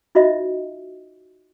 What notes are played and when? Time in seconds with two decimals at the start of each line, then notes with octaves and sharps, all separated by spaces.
0.15 D#4 F4 F#4 C5 D#5 E5